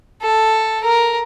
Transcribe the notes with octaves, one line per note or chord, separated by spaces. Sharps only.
A4
A#4